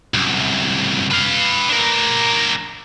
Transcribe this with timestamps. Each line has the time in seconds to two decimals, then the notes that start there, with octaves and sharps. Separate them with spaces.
0.14 C2 F#2
1.11 B4 F5
1.69 D4 A#4